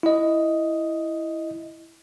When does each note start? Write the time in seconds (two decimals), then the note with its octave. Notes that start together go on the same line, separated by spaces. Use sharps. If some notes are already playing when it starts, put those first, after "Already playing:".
0.03 E4 D#5